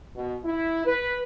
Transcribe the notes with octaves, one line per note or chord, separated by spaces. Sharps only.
B2
E4
B4